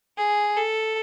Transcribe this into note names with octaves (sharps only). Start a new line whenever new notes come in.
G#4
A4